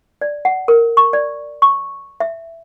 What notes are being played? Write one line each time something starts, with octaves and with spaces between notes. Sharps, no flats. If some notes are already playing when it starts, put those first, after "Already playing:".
D5
F#5
A#4
C#6
D5
C#6
E5